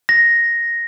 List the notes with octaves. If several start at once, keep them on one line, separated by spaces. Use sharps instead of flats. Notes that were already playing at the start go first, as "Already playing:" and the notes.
A#6